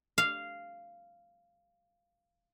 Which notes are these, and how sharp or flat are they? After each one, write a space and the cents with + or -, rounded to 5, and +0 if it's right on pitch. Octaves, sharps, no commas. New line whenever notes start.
F5 -10